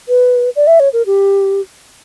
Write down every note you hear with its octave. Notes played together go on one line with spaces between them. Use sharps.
B4
D5
E5
C#5
A#4
G4